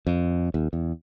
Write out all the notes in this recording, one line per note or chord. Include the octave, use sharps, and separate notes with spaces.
F2
D#2
E2